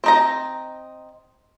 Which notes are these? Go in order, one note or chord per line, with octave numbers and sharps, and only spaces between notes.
C4 D#4 A#5